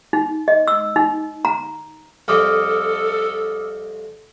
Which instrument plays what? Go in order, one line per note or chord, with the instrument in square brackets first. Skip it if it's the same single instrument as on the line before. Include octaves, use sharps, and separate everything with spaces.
[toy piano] D#4
D#5
E6
D#4
A#5
[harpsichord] C2 F2 [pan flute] A4 [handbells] D6 D#6 F6